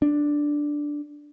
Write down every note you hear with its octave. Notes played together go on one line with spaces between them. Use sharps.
D4